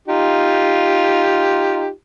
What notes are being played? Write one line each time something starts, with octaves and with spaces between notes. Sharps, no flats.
D#4 F4 G4